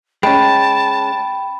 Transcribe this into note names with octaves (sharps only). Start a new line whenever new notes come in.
G#3 C#4 G5 A5 B5